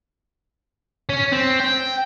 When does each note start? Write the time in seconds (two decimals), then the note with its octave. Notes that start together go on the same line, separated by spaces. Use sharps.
1.09 C#4
1.32 C4
1.60 G5